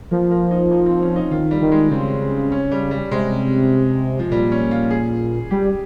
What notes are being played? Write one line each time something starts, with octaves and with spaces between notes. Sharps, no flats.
F3 A#3
A#3
D#4
D#4
C4
C#4
D#4
D#3 F4
G3
D#3
G#3
C#3 C4
C#4
G3
G3
C3 G#3
F3
A#2 G3
C#4
F4
G#4
G3 G4